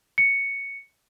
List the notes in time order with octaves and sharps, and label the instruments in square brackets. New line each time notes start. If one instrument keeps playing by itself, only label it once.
[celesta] C#7